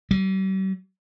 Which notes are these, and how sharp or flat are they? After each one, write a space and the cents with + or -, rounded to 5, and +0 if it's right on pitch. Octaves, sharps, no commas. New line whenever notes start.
G3 -45